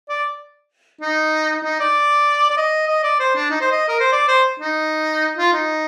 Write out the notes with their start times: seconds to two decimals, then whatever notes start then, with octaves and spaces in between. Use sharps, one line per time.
0.09 D5
1.01 D#4
1.64 D#4
1.80 D5
2.50 D5
2.57 D#5
2.88 D#5
3.03 D5
3.20 C5
3.35 D4
3.51 D#4
3.61 C5
3.72 D#5
3.88 A#4
4.00 C5
4.12 D5
4.28 C5
4.60 D#4
5.37 F4
5.53 D#4